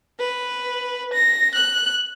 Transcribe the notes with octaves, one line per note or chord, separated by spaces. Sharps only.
B4
A#6
F#6